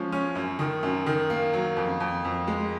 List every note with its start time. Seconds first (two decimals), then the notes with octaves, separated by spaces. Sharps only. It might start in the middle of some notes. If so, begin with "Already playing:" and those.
Already playing: F3 G#3 C#4
0.12 C#4
0.35 F#2
0.59 D#3
0.83 F#2
1.06 D#3
1.30 A#3
1.53 F#3
1.77 F2
2.00 F2
2.25 F2
2.47 G#3